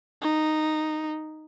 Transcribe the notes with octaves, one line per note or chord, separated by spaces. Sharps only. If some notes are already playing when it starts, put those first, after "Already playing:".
D#4